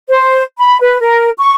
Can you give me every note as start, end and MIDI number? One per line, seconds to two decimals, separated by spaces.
0.08 0.42 72
0.58 0.77 83
0.81 0.99 71
1.00 1.30 70
1.38 1.55 85